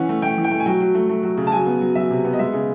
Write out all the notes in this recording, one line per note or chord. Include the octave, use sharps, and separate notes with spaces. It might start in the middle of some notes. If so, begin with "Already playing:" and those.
Already playing: E3 C#4 F#5
A3
A3 G5
E3
G5
A3
G#5
F#3 G5
F#3
A3
A3
F#3
C#3
A5
F#3 G#5
B3
F#3
F#3 E5
C3
B3
D#5
G#3 E5
C#3